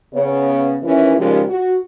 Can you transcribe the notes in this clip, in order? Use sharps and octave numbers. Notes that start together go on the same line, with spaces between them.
C#3 B3 C#5
D#2 E3 C#4 E4
D#2 C#3 F3 G3 G#3 G4
F#4